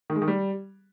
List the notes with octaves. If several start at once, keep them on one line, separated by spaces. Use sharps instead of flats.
D#3
G#3
D#3
G3